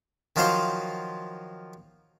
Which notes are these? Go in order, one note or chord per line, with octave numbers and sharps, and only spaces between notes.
D#3 F3 F#3 F4 C5 F5